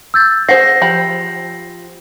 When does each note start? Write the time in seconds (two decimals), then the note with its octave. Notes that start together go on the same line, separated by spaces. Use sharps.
0.14 E6 G6 A6
0.49 G#4 C5 F#5 A#6 C7
0.82 F3 G4 B5